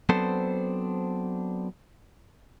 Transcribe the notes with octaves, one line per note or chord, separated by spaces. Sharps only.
F#3 B3 C4 D4 A4 C5